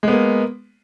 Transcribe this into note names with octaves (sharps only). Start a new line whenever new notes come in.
G#3 A#3 B3